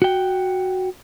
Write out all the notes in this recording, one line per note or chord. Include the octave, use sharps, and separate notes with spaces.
F#4 G5